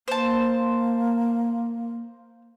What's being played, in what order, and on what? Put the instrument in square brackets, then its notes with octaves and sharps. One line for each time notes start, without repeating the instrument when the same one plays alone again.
[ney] A#3 [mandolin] C5 A5